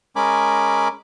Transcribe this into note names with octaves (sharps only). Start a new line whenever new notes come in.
G#3 C#4 A#4 G#5 B5 D6